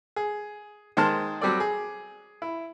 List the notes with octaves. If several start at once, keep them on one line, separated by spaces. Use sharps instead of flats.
G#4
D#3 G#3 C5 A5 F6
F#3 G3 C4 A4 D5
G#4
E4